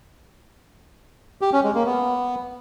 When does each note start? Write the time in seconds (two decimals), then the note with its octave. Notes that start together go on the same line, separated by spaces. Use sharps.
1.41 G4
1.53 C#4
1.64 G#3
1.75 A#3
1.86 B3